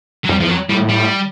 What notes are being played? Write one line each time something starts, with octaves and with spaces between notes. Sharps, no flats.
F#3
F2 G3
E2 F3
F2 F#3
A2 G3
G3